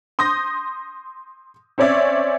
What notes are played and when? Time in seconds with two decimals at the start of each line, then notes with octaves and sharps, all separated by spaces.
0.19 C6 D#6 G6 A#6
1.78 C4 C#4 C#5 D5 E5